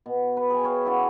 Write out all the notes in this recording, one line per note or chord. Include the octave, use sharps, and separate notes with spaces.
B2
B4
G#4 G5 G#5
B4 C#5 F5
C#4 E4 F#4 D5